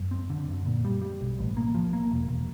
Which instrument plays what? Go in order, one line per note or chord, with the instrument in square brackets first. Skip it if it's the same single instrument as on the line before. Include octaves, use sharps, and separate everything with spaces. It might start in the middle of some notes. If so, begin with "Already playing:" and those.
Already playing: [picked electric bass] F#2
C4
D3
F#2
A#2
G3
G3
B1
A1
A#3
F3
A#3
E1
E1